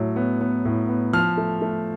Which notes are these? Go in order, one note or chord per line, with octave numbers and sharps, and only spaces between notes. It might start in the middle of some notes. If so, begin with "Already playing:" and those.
Already playing: A2 F#3
B3
B3
A2
B3
F3 F6
A3
A3